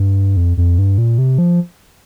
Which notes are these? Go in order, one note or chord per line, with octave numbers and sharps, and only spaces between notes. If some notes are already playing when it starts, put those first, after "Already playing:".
Already playing: G2
F2
F2
G2
A#2
C3
F3